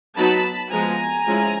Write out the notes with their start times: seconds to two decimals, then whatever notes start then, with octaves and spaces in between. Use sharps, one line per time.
0.16 F#3 B3 D#4 A5 B5
0.71 F3 G#3 B3 G#5 A#5
1.26 F3 G#3 C#4 E4